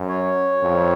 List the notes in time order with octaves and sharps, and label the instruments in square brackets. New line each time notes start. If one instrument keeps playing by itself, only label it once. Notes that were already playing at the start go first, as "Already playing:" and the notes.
Already playing: [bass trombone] F#2
[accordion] C#5
[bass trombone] F2